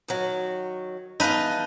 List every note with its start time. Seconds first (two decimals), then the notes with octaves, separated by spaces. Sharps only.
0.08 D#3 F#3
1.20 E2 D#4 B4 F5 A5